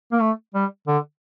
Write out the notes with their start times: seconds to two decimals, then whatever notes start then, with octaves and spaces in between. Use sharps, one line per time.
0.12 A#3
0.21 A3
0.54 G3
0.87 D3